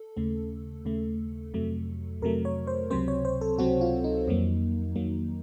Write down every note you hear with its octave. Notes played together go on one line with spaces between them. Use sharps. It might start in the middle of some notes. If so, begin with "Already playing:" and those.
Already playing: A4
D#2 C#3 A3
D#2 C#3 A3
F2 C3 F#3 A3
F2 C3 F#3 A3 A#4
C#5
C5
C#2 C3 F#3 C4 C5
C#5
C5
A4
C#2 C3 F#3 C4 F#4
F4
D#4
F2 D#3 F#3 A#3
F2 D#3 F#3 A#3